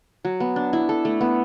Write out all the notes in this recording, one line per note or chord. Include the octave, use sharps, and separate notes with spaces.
F#3
B3
D4
E4
A4
A3
B3